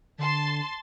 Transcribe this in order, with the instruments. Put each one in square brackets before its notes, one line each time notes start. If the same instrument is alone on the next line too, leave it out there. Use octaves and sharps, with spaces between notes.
[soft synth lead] D3 [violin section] A5 C6 A6